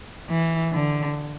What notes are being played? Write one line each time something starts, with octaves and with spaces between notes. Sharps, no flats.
E3
D3